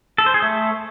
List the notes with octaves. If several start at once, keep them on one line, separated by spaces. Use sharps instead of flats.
A4
C5
G#4
A3